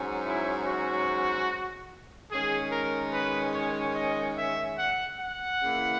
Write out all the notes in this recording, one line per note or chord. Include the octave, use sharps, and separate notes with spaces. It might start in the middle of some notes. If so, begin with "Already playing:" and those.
Already playing: G#2 F#3 C#4
E4
F#4
D#3 G#3 C#4 G#4
A#4
B4
C#5
D#5
E5
F#5
F#5
C#3 E3 A#3 E4